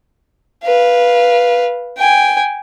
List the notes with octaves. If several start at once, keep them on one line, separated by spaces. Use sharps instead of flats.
B4 F5
G5 G#5